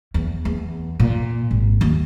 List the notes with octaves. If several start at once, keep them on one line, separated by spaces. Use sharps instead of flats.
E2
E2
A#2
G#1
D#2